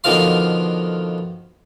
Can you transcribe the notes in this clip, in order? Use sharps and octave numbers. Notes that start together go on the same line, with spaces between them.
B2 D3 D#3 F3 F5 C6